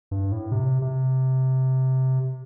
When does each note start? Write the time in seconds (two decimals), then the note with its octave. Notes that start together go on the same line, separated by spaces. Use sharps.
0.11 G2
0.32 A2
0.52 C3
0.82 C3